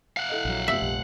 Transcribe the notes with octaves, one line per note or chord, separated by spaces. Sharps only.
F5 F#5
E4 A4 D#5
A#1 F#3
F1 G3 E5
A#1